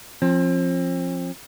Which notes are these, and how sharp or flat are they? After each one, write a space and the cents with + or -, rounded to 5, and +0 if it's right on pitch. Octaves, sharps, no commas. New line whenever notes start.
F3 +0 C4 +35